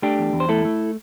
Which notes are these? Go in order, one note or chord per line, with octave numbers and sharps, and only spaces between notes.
A3 D4 G4
E2
E2
C5
A3 E4 A4
A3